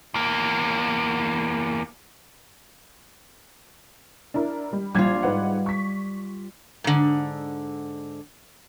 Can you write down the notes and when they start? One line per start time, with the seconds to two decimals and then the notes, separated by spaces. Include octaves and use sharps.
0.14 E2 A#3
4.34 D4 E4 A#4
4.73 G3
4.94 A#1 G3 F4 G#6
5.23 G#2 B4 F#5
5.66 C#6 B6
6.84 G#2 D3